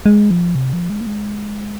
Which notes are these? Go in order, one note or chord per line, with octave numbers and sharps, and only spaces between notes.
G#3
F3
C3
F3
G#3
A#3
G#3